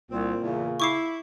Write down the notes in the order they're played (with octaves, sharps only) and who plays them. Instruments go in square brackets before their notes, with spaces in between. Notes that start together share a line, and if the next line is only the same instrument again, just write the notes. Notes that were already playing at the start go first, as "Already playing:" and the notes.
[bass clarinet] C2 [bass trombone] A#2 [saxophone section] C4
[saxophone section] E2 [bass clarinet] C#3
[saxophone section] E4 [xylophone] C#6 D6 C7